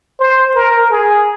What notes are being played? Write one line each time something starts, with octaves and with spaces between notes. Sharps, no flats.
C5
A#4
G#4